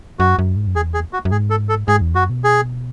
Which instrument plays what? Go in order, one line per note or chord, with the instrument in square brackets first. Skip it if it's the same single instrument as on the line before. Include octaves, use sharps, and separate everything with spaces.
[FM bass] F#2 [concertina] F#4
[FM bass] F#2
G#2
F#2
[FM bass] E2 [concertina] G#4
[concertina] G#4
F#4
[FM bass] F#2
[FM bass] G#2 [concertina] G#4
[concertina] A4
A4
[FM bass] G#2 [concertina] G#4
[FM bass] E2
[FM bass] F#2 [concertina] F#4
[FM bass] B2
[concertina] G#4